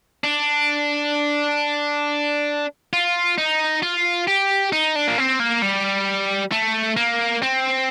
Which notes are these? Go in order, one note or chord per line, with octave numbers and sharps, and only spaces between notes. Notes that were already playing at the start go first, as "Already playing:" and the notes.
D4
F4
D#4
F4
G4
D#4
D4
A#3
C4
A#3
G3
A3
A#3
C4